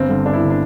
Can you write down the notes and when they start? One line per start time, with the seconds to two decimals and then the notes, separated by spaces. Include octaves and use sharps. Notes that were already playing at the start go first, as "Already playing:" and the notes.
Already playing: G1 C4
0.09 G2 D3
0.26 G1 D4
0.33 E4
0.44 D3
0.50 D4